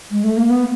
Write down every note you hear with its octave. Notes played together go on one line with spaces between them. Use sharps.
G#3
A3
A#3
B3